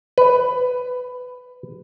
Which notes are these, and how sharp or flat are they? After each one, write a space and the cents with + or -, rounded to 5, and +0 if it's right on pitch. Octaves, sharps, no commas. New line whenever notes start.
B4 +15